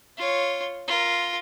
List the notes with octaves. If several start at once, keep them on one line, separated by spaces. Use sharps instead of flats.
F4 C#5
F4 A#4